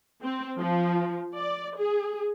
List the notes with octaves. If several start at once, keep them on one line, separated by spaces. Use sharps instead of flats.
C4
F3
D5
G#4